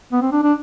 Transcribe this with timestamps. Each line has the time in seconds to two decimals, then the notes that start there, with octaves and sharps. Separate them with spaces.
0.12 B3
0.22 C4
0.32 D4
0.43 D4